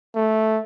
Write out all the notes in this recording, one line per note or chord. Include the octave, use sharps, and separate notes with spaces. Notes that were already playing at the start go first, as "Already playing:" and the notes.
A3